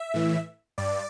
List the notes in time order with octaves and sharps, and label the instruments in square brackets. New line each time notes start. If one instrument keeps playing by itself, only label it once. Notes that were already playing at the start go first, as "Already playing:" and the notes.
Already playing: [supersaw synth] E5
A2 E3
G2 D5